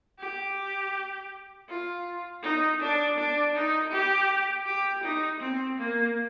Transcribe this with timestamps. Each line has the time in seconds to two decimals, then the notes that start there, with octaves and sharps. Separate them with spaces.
0.19 G4
1.69 F4
2.42 D#4
2.80 D4
3.17 D4
3.55 D#4
3.91 G4
4.65 G4
5.03 D#4
5.40 C4
5.78 A#3